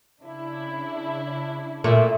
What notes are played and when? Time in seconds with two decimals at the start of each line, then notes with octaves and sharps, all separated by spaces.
0.21 C#3 D4 E4
1.84 A#2 A3